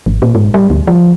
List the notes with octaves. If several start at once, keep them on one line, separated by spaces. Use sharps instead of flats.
G#1
A#2
G#2
G3
D2
F3